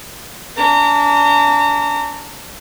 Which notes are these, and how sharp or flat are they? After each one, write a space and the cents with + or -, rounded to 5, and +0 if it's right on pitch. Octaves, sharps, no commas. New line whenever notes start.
D4 -35 A#5 -35